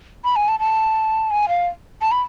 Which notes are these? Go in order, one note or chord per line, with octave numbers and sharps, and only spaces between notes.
B5
G#5
A5
A5
G#5
F5
A5
B5